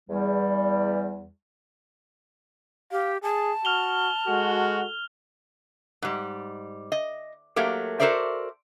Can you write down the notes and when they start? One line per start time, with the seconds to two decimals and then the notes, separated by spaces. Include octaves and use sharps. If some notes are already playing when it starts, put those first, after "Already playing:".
0.09 E2 G3
2.92 G4 F5
3.23 G#4 A5
3.65 F#4 F6 F7 G7
4.27 G#3 F#4 A4
6.02 G#2 G3
6.92 D#5
7.56 F#3 A3 A#3 G4 A#4
7.99 F#4 A4 A#4 C5 D5 E5